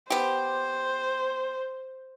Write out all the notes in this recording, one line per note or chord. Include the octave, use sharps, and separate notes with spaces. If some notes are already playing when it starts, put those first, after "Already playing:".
B3 G4 C5